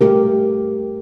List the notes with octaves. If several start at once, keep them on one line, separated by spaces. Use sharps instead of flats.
A3 G4 A#4